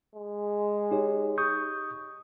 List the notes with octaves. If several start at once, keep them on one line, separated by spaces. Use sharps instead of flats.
G#3
D#4 G4 C#5
C#6 D#6 G6